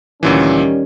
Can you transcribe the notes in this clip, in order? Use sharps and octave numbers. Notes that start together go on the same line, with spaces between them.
D2 A#2 D#3 E3 G3 C#4